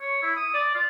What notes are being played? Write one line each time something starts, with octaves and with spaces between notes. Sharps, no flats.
C#5
E4
D#6
D5
F4